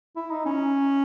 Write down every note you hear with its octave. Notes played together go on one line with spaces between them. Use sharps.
E4
D#4
C#4